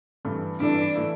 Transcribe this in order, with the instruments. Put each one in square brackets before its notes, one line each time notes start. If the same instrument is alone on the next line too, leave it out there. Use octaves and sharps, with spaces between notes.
[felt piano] G2 E3 A3 E4
[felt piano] G2 E3 A3 E4 [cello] D4
[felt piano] E3 A3 E4